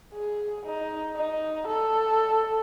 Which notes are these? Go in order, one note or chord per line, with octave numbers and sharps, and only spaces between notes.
G#4
D#4
D#4
A4